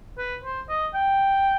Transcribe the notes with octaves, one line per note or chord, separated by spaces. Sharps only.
B4
C5
D#5
G5